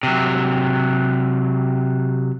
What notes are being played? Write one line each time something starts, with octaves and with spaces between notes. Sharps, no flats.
C3 F#3